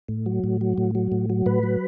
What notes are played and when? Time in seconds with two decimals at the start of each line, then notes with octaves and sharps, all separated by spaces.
0.08 A2
0.26 F#3
0.44 A2
0.61 F#3
0.78 A2
0.95 F#3
1.12 A2
1.30 F#3
1.46 A2 B4
1.63 F#3